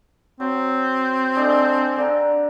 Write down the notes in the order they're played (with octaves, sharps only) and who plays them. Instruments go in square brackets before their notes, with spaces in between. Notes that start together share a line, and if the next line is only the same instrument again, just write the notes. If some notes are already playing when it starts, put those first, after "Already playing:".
[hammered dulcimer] F#3 [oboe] C4
[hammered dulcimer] G#3 D4 A4
D3 D5 A#5